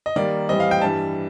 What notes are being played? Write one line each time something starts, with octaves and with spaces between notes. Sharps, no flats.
D#5
D#3 G3 A#3 D5
A2 E3 G3 C4 D#5
F5
G5
G2 E3 G3 A5